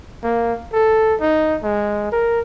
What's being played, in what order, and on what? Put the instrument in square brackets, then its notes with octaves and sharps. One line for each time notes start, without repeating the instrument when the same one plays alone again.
[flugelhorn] A#3
A4
D#4
G#3
A#4